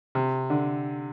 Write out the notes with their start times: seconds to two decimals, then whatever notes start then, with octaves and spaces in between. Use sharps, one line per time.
0.15 C3
0.50 D3